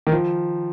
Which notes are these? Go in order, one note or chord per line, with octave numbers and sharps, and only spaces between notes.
D#3
F3